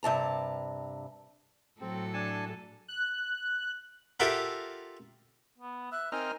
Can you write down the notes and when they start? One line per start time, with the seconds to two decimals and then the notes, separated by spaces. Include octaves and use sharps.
0.03 G2 C3 A5 A#5
1.81 A2 F#3 C4 A4
2.13 D4 G#5 A5
2.88 F#6
4.20 F4 G4 A4 A#4 E5 F#5
5.58 B3
5.92 E5 F#6
6.12 C4 D#4 A#4 G#5 F6